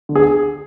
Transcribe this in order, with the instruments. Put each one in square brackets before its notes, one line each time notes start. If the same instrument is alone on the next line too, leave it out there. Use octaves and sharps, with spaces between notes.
[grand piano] D3
G#4